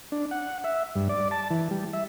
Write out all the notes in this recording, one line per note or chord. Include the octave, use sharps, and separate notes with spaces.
D4
F#5
E5
G2
D5
A5
E3
G3
E5